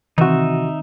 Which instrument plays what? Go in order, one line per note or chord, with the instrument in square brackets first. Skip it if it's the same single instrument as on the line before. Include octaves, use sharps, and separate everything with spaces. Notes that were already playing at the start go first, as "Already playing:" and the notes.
[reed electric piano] C3 F#4 [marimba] D#3 C4 [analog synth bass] E3 [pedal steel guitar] D#4 E5